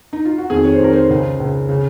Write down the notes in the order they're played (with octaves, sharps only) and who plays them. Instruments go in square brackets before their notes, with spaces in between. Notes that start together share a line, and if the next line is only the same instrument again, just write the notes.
[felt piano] D#4
F4
F#4
F2 D#3 G#4
C#5
C5
F2 D#3 A#4
C5
C#2 C#3
C#2 C#3
C#3